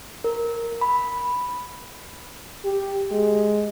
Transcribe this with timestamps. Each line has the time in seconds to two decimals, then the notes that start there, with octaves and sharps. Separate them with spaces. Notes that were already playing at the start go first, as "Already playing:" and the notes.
0.24 A#4
0.81 B5
2.65 G4
3.11 G#3